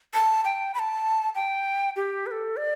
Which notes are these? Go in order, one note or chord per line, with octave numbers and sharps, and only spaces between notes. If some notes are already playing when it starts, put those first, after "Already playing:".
A5
G5
B5
A5
G5
G4
B4
A4
D5